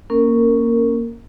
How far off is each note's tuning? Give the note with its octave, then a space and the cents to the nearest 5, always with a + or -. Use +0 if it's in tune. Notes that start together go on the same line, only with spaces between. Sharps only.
A#3 +0 C#4 +0 A#4 -15